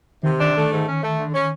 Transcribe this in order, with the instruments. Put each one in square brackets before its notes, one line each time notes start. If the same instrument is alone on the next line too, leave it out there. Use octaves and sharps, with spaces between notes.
[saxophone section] C3 [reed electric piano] D#3
[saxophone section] D4
A3
G#2
C#4
A3
D3
C#4